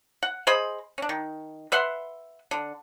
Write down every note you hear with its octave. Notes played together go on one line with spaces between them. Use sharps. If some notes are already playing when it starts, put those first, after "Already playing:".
F#5
G#4 C5 D#5 B5
C#4 D4
D#3
B4 E5 F#5 C6
D3